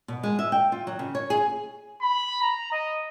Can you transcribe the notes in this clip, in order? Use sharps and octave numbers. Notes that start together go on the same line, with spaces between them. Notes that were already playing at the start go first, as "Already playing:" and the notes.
B2
G#3
E5
G5
F4
F#3
C#3
C#5
G#4
B5
A#5
D#5